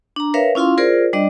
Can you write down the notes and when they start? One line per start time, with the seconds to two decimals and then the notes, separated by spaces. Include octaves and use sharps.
0.16 D4 A#5
0.34 A#4 B4 C#5 E5 F5
0.55 C#4 E4 F4 F5 C6
0.78 F4 G#4 A#4 C5 D5
1.13 G3 D4 D5 D#5